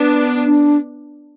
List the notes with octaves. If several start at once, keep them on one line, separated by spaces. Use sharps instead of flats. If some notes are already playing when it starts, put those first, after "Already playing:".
Already playing: B3 D4
D4